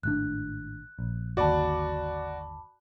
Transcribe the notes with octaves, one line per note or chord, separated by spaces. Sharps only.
G#1 A2 D4 F#6
A#1
G1 D#2 F#4 D5 A5 B5 D6